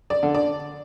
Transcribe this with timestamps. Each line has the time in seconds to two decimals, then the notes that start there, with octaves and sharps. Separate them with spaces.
0.10 D5
0.23 D3
0.35 D5